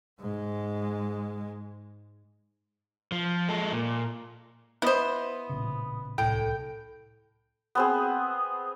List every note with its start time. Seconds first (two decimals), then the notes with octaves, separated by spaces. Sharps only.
0.20 G#2 G#3
3.12 F3
3.49 G#3 A4
3.72 A#2
4.82 B3 E4 C5 D#5
5.49 A1 A#2 C#3
6.18 D1 C2 A2 G5
7.75 B3 C4 G#4